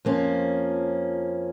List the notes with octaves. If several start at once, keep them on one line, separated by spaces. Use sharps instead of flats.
F2 F3 A#3 C#4